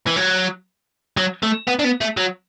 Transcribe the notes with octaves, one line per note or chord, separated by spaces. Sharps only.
E3
F#3
F#3
A3
B3
D4
B3
A3
F#3